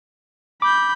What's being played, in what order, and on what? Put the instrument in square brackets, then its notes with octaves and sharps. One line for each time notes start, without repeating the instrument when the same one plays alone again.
[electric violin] B5 G6 [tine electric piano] D6